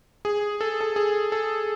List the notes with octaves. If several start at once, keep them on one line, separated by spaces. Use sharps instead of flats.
G#4
A4
A4
G#4
A4